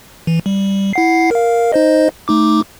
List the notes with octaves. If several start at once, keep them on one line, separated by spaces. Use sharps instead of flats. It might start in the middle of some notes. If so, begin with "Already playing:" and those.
E3
G3
E4 F#5 C7
A#4 F5
D#4 C5 D#5
A3 D#4 D6